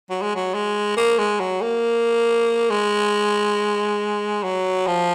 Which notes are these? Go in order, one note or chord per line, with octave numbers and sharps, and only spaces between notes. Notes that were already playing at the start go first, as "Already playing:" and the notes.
F#3
G#3
F#3
G#3
A#3
G#3
F#3
A#3
G#3
F#3
F3